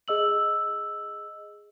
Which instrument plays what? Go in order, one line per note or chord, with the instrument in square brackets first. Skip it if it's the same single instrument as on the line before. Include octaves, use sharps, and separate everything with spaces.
[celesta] G#4 D#5 E6 F#7